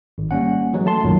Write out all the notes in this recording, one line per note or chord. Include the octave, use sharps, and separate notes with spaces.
G#1
G3 A#3 C#4 F#5
E3 F#3 G#3
A3 A5 C6
C2 F#2 A#2 D#3 F#3